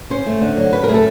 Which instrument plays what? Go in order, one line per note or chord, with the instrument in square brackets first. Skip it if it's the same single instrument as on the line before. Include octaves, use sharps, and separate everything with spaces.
[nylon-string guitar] C#4 C5
A3
D3
F#3
C#4 B4
A#4
A3 G#4
A4